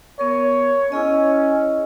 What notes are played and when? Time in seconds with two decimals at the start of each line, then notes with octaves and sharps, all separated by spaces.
0.19 B3 A#4 C#5
0.92 C#4 E4 G#4 D#5